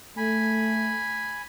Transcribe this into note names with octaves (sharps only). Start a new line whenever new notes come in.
A3 G#5 B5